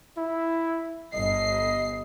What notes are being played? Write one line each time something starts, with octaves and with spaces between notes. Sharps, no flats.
E4
G1 D#5 C7